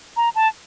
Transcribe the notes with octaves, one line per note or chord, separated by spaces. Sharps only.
A#5
A5